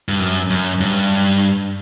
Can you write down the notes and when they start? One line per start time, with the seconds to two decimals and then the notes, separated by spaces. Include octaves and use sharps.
0.09 G2
0.20 F#2
0.50 F#2
0.81 G2